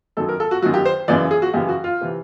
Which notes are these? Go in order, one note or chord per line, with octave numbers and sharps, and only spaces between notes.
F#2 D#3 F#3 A4
A#4
A4
F#4
F#2 D#3 F#3 F#4
G4
C5
F#2 C#3 E3 D5
G#4
F#4
F#2 C#3 E3 G4
F#4
F4
C3 E3